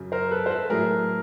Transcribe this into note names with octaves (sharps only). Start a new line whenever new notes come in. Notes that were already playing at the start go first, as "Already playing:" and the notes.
Already playing: F#2 C#3 F#3
A#4 C5
A4 B4
C5
A4 B4
A2 F#3 A3 G#4 A#4